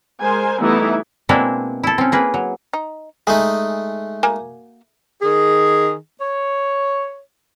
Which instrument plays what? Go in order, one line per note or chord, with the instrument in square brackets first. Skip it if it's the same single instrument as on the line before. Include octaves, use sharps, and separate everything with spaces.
[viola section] G#3 A#4 C5 G#5
E3 G3 A3 B3 D#4 E4
[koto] B2 G#3 A#3 C4 D4 E4
E4 A4
C4 C#4
A#3 G#4 B4
F#3
[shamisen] D#4
[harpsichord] G#3 A3 D#4 [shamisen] G#4
[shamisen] A#3 F#4 G#5
[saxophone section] D#3 G#4
C#5